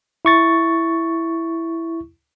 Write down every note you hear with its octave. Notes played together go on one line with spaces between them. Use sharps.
E4 C#6 A6